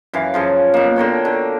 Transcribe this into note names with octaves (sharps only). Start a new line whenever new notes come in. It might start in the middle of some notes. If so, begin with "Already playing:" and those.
F#2 E3 F5
F#2 C#3 F3
B2 A#3
D3 A#4 C#5 G5
D3